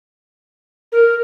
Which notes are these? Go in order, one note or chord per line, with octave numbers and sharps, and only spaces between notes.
A#4